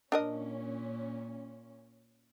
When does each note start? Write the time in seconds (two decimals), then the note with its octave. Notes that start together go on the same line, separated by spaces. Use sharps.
0.12 A#2 C#4 D4 A#4 D#5